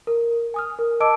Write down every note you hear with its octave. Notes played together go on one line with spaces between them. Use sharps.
A#4
G#5 D#6 F6
A#4
D#5 A5 D6 E6 D7